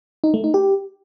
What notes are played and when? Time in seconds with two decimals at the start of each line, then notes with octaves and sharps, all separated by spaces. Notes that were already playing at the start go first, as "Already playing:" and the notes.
0.24 D#4
0.34 A3
0.44 D#4
0.54 G4